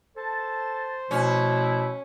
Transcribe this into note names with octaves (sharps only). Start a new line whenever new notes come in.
A4 C5 A5
B2 F3 A3 C#4 E4